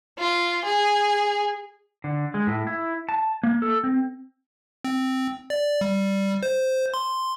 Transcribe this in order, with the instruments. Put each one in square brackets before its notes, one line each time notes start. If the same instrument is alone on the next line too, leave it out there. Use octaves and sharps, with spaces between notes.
[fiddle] F4
G#4
[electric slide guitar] D3
G#3
A2
E4
A5
A#3
A4
C4
[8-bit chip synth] C4
D5
G3
C5
C6